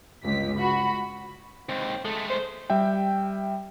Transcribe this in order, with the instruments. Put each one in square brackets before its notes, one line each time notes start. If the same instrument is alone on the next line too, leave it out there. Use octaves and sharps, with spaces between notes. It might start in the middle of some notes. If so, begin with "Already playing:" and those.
[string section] G1 C#2 B6
F#4 B5
[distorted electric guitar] D#2 G#2 [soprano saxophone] C4
[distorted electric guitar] G#3 A3 [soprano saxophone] A4
[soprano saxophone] C5
[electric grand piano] G3 E5 G5